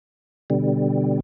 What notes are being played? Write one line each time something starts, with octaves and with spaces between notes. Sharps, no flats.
B2 D3 G3